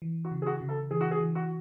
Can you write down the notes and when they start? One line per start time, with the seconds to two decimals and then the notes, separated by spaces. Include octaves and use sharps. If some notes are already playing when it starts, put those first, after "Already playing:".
0.02 E3
0.25 F#4
0.32 C#3
0.42 G#4
0.46 F#4
0.61 C#3
0.69 A4
0.91 E3 G#4
1.01 F#4
1.11 G#4
1.20 E3
1.35 F#4